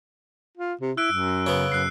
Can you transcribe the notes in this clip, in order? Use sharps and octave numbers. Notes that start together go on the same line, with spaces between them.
F4
C3
E4 E6 F#6 D7
F#2
C#3 B3
F#2 F#6 C7